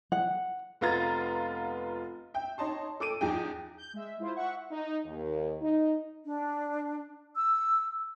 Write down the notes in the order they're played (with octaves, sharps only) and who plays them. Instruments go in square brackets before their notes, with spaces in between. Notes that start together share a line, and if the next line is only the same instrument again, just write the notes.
[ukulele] F#5
[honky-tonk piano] F1 B3 F4 A#5 A6
E5 G5
D#4 C#5 D#5 A5 C6
A4 D6 D7 D#7
E2 F3 D#4 G#4 G5
[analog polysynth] G6
G#3 E5
E4 F4 C5
E5 F#5 C#6
[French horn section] D#4
D#2
D#4
[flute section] D4
E6